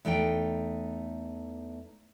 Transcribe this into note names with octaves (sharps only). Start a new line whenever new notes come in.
E2 A3 D#4 G5